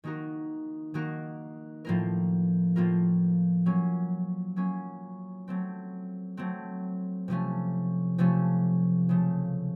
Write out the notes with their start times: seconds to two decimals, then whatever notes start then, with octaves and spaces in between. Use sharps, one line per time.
0.04 D#3 A#3 D#4 F#4 A#4
0.94 D#3 A#3 D#4 F#4 A#4
1.85 A2 F3 A#3 F4 A#4
2.76 A2 F3 A#3 F4 A#4
3.66 F#3 A#3 C#4
4.56 F#3 A#3 C#4
5.48 F#3 A3 C4
6.37 F#3 A3 C4
7.28 C3 F3 A3 C#4
8.18 C3 F3 A3 C#4
9.09 C#3 F3 A3